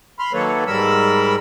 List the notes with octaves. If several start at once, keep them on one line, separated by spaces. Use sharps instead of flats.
B5 C6 F6
D#3 F#3 A#3 A4 B4 C#5
G#2 G3 A#4 B5 E6